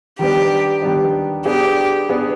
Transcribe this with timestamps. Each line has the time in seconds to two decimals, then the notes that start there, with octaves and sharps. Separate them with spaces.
0.19 D#3 G3 B3 D4 G4
0.82 D#3 G3 B3 D4
1.46 B3 D4 G4 G#4
2.09 B3 D4 G#4